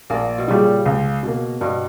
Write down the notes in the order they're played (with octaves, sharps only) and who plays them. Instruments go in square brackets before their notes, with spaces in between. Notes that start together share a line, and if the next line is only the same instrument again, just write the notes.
[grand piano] A#1 [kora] A#3
[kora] B2
[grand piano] A#2 G3 [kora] C#3
[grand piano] C#2
B2 A#3
[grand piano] G2 [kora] B2